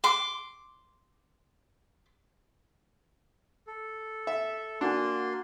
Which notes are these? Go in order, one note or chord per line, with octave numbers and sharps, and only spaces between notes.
C6 D6
A4
E5
A#3 D4 F#4 G#5 C6